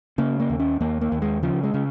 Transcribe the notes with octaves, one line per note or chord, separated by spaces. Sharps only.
C#3 A#3
A#3
D#2
C#4
D#2 A#3
A#3
D#2
G#3
C#3 F3
G#3
C#3